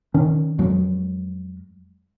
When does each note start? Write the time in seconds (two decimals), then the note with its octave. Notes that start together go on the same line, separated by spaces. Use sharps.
0.14 D#3 C#4
0.58 F2 F#3 G#3